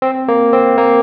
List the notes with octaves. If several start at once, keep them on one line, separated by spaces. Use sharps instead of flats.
C4
A#3
C4
A#3